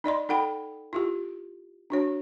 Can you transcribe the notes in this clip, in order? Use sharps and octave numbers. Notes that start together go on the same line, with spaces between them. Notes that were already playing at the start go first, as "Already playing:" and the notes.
D#4 D5 D#5 C6
D#4 A4 F#5 G5 B5
E4 F4 G4
D4 F#4 C#5